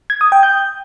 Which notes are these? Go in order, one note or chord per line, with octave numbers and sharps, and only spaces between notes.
G#6
D#6
G5
G6